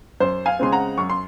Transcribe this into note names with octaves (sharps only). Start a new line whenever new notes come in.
F#2 C5
F5 G#5
C#3 G#3 C4 C6
F#5 A#5
F#2 C#6
C6